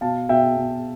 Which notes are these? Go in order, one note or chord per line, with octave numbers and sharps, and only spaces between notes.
B2 F5 A5
B2 E5 G5
B2